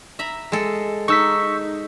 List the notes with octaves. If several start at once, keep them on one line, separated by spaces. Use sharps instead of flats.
E5 A#5 B5
G#3 A4
D#4 C#6 E6 B6